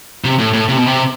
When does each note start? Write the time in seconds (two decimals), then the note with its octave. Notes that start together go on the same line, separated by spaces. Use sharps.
0.24 C3
0.39 A2
0.53 A2
0.68 C3
0.77 B2
0.86 C3